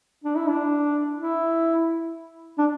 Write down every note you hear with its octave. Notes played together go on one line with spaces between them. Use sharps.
D4
E4
D4
E4
D4